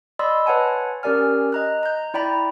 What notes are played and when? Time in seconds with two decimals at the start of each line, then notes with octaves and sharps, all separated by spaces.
0.19 D5 D#5 B5 C6 E6
0.46 B4 C#5 F#5 G#5 A5
1.03 C#4 G4 A#4 D5 G#5 F6
1.52 D#5 A#5 F#6
1.83 A#5 G6
2.14 E4 D5 G5 A#5 B5